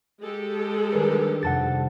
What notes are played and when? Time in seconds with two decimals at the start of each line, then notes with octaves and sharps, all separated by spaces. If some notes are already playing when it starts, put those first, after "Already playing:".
0.21 G#3 G4 A4
0.93 D#3 G3 D4 A#4 B4
1.43 F2 C3 F#5 A5 A6